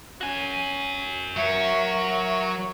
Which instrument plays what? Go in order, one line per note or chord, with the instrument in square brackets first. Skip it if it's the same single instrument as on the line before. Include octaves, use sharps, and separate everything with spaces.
[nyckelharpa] C#4 [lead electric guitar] F#4 G#5
[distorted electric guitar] F#3 C#5 [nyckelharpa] A#4 C#6 [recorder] E5